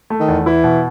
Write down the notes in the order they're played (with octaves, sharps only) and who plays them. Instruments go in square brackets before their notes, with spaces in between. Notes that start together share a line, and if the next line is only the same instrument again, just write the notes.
[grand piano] A3
[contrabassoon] D#3
[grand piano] E2
[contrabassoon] E3 [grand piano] E4
[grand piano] B2